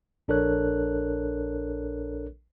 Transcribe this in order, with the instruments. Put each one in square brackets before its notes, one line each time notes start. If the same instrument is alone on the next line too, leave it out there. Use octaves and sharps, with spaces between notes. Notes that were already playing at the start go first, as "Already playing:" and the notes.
[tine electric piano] A#1 D4 A4 A#4 C#5 F#6